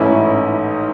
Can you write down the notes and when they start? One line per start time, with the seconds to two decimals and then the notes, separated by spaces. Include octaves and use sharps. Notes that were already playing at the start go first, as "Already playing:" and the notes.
Already playing: A1 G#2 E3 A3 C#4 E4
0.35 D#4